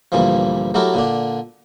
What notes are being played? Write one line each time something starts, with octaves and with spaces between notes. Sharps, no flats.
D2 G2 A#2 E3 F3
F#3 A3 E4 G4 A4 A#4
A#2 D3 D4